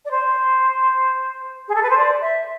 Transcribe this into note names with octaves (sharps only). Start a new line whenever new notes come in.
D5
C5
G#4
A4
B4
C5
D5
E5